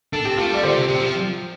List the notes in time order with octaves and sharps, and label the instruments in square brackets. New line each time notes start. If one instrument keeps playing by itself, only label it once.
[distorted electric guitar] D4 [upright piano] A4
[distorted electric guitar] C4 [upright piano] G4
[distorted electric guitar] A3 [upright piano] F4 A4
[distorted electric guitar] G3 [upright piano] D5
[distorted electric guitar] D3 [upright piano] G4 C5
[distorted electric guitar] C3
[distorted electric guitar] C3 [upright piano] G4
[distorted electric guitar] F3